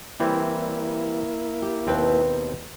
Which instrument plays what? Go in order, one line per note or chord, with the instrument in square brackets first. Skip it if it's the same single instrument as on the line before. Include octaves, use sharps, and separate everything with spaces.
[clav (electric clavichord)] E3 G3 C4 [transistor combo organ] A#3 E4
[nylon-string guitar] G4
[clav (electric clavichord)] D#2 C4 G5 [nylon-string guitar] B2 B4